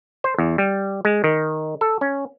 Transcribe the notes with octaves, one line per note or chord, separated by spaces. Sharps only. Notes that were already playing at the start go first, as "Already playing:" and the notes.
C5
E2
G3
G#3
D#3
A4
C#4